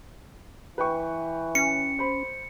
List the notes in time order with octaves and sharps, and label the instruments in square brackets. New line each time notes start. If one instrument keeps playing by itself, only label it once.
[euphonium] E3 [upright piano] B4 G5 C#6
[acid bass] C#4 [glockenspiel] C#7
[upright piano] C5 B5